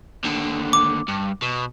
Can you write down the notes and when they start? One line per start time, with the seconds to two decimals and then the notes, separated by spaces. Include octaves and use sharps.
0.24 D#2 D3
0.73 D6
1.08 G2
1.42 B2